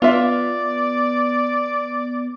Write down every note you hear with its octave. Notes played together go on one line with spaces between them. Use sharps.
B3 F4 D5 E5